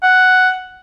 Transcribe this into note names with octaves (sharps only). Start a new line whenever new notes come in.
F#5